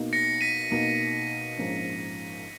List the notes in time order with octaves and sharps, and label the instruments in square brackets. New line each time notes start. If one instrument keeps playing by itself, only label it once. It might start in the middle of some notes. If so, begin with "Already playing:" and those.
Already playing: [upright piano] B2 A#3 D#4
[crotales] A#6 C#7
B6 D#7
[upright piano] B2 A#3 D#4
A#1 G#2 F3 A#3 C#4